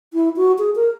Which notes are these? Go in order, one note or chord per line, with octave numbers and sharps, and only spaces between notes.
E4
F#4
G#4
A#4